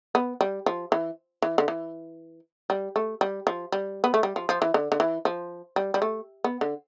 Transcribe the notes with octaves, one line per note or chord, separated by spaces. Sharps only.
B3
G3
F3
E3
E3
D3
E3
G3
A3
G3
F3
G3
B3
A3
G3
F3
F3
E3
D3
D3
E3
F3
G3
G3
A3
B3
D3